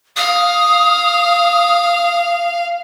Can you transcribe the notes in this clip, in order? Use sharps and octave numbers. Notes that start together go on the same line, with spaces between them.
F5 D#6